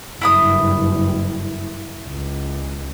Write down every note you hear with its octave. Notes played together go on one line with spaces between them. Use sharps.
F#1 G2 E4 B5 D#6
C#2